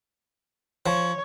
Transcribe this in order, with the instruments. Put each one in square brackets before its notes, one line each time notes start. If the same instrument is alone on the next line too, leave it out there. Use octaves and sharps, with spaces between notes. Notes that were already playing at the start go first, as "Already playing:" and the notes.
[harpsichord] F3 [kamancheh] C#5